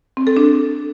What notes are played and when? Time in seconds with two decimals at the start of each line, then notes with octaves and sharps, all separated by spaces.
0.17 C4
0.27 A4
0.37 D4